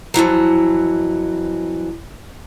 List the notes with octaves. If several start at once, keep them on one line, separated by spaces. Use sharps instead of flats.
F2 A2 E3 F#3